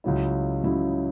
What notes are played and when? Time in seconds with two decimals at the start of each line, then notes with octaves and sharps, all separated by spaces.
0.04 C#2 C#3 F#3 E4
0.63 C#2 C#3 F#3 E4